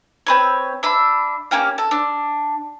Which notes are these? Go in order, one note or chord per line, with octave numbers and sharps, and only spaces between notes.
C4 B4 C#5
D4 E5 B5
A#3 C#4 G4 F5
A4
D4